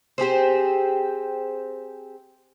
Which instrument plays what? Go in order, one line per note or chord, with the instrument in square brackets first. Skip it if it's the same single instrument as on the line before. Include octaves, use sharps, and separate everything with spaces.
[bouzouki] C4 G4 G#4 C5